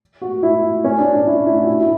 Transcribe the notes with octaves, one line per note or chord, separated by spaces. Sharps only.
F#4
E4
C#4
D4
D4
E4
E4
F#4
E4
E4